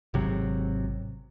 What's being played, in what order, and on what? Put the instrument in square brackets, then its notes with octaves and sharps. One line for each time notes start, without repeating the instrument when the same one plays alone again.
[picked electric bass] G#1 C3 F#3